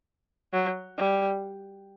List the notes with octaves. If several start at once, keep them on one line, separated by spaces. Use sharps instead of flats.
F#3
G3